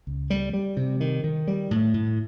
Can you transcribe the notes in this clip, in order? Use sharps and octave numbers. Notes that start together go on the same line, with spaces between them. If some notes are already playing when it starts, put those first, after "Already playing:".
C#2
G3
G3
C3
D#3
D#3
G3
A2
A2